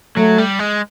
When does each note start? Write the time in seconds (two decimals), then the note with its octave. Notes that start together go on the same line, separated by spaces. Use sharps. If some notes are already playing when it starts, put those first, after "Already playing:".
0.17 F#3 A3
0.38 G3
0.59 G#3